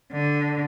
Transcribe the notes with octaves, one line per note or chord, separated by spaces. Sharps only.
D3